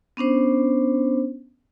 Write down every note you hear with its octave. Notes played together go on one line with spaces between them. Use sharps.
B3 C#4 D4 C5